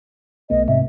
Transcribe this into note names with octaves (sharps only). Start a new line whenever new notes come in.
B1 A3 B3 D#5
G#2 C3 E5